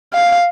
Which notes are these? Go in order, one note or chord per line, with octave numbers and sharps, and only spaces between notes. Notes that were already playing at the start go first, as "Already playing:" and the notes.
F5